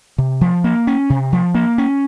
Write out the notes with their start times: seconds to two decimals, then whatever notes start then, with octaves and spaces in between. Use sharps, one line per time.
0.18 C3
0.41 F3
0.64 A#3
0.87 C#4
1.10 C3
1.32 F3
1.55 A#3
1.78 C#4